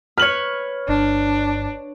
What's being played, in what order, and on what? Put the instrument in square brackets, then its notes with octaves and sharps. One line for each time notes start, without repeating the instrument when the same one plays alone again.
[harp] B4 C#5 [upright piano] F6 F#7
[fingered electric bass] G1 [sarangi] D4